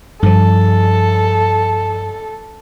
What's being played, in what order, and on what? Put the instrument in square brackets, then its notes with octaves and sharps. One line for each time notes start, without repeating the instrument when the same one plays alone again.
[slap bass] G2 F3 [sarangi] A4